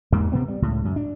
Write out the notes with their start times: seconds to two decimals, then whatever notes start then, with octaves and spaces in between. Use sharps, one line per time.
0.12 E2 G#2 G3 A#3
0.32 C3 B3 C4
0.48 G3
0.62 C#2 A2
0.85 F#2
0.96 D4